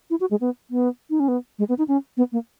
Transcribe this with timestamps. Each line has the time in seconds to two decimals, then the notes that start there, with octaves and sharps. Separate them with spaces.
0.10 E4
0.20 F#4
0.31 G#3
0.41 B3
0.70 B3
1.10 D#4
1.20 C#4
1.28 B3
1.59 G#3
1.69 B3
1.78 D#4
1.88 C#4
2.17 B3
2.32 A#3